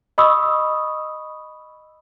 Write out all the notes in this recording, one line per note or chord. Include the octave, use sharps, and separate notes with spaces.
D#5 B5 C#6 D#6 E6